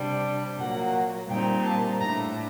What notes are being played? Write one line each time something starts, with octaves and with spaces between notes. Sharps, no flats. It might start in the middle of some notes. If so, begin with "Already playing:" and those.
Already playing: C3 G3 D4
A#2 F#3 A#3 F#5
A#2 G3 C4 D#4 G5
A5
A2 A3 D4 A#5